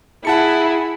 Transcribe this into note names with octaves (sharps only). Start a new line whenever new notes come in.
E4 G#4 F#5 A5 C#7